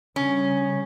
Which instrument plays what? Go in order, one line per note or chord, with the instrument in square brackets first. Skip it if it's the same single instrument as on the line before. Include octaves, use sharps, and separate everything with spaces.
[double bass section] C#3 G3 [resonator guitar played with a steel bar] C#4